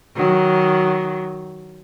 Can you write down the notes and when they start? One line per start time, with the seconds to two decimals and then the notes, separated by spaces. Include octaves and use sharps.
0.16 D#3 F#3